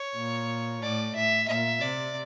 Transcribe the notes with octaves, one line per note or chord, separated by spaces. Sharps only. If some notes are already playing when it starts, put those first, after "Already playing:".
Already playing: C#5
A#2
A2 D5
A2 E5
A#2 E5
C3 D5